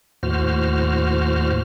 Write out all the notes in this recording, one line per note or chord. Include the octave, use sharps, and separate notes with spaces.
D#2 A2 F#4 C5 F6